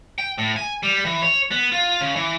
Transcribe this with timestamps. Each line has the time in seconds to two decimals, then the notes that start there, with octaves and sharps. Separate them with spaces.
0.18 G5
0.38 A2
0.56 G#5
0.83 G3
1.05 E3
1.22 C#5
1.51 B3
1.72 F4
2.01 C#3
2.15 E3